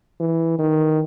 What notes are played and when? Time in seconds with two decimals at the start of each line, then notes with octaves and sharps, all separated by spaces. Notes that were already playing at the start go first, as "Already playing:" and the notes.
0.21 E3
0.59 D#3